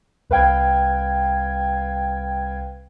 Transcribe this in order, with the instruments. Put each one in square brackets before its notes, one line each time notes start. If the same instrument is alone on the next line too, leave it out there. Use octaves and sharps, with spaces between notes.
[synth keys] C2 B4 F5 G5 G#6